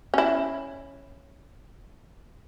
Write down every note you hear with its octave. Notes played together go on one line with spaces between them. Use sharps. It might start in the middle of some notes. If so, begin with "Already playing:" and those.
C#4 E4